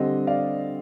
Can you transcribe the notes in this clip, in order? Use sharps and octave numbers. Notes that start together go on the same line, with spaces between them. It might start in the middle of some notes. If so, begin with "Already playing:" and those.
Already playing: D3 G3 C4 D#5
D5 F5